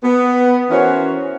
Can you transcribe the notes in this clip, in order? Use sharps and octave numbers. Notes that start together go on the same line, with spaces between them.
B3
E3 C#4 F#4 A#4 C5 C#5